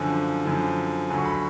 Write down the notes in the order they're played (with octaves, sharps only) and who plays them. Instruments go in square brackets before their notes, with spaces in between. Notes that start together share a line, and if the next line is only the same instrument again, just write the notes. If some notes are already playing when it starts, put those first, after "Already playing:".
Already playing: [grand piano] F#2 D3 F3 G#5
F#2 D3 F3
D2 D3 F#3 G#5
C#6
B5